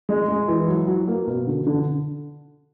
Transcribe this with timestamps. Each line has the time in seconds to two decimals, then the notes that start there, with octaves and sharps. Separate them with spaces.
0.09 G#3
0.29 G#3
0.48 E3
0.68 F#3
0.88 F#3
1.07 A#3
1.27 B2
1.47 D3
1.67 D3